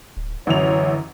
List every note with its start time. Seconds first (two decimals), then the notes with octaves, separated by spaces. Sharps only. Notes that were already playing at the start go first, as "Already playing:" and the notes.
0.17 D1
0.47 A1 F#2 D3 C#5 F7